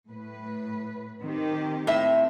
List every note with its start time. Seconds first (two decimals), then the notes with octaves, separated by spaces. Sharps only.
0.10 A2 B4
1.22 D#3 C4 G4
1.87 A2 C4 E5